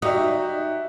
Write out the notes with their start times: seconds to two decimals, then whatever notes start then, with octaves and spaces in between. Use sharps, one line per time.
0.02 D#4 F#4 G4 E5